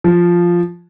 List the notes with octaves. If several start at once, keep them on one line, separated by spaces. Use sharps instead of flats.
F3